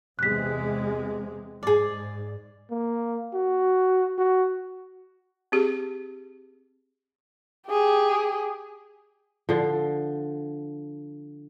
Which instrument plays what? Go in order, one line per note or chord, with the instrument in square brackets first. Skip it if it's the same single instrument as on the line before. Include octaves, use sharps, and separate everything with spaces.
[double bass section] E2 C3 G#3 [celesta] F#6 B6
[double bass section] G#2 [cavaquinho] G#4 D5
[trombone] A#3
F#4
F#4
[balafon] C4 G4 G#4
[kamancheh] G4 G#4
[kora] D3 F3